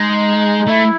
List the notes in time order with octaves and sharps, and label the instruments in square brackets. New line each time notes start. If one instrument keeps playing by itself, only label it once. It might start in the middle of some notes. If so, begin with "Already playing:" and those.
Already playing: [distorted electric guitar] G#3 [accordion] D#4
[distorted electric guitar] A3 [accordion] E4